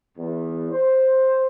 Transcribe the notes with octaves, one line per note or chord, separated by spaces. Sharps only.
E2
C5